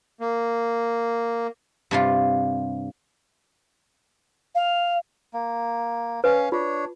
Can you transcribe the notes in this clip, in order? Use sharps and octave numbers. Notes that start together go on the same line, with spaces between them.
A#3
G2 C3 F4
F5
A#3
C#4 B4 F5
D4 F4 C#5